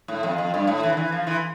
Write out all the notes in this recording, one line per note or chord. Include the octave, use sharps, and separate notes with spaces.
A2
F2
F2
G2
A2
E3
D3
E3
F3
E3